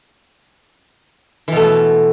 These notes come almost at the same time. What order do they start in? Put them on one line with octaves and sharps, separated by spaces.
E3 B2 A3